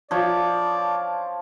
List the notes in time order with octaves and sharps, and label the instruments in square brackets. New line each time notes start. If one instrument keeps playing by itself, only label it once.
[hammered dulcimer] F3 C#5 [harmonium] D5